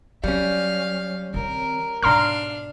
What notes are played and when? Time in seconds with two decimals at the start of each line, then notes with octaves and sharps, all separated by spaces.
0.24 F#3 G3 C#4 F5
1.34 D#3 C4 A#4
2.03 G#2 B2 D4 F5 A#5 C6 F6